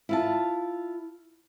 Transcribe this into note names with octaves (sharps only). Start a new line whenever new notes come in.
E4 F4 A5